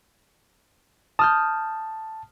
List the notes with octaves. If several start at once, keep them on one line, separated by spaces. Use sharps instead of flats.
A5 D#6 F6 G6